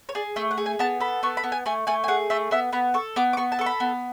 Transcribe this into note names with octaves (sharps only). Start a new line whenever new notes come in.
C#5
G#4 D5
A3 E5
F#5
G#4
G#5
B3 A5
A4 B5
B3 C#6
B5
B3
G#5
A3 G#5
A3 G#5
G#5
G#4 F#5
A3 E5
B3 E5
B3 B5
A4 C#6
B3 D6
D6
B3 C#6
A5
A4 C#6
B5
B3